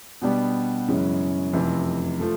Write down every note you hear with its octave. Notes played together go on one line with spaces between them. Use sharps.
B2 G3 B3 D4 G4
F#2 C#3 E3 G#3 C#4
F1 F2 C3 E3
F3 A3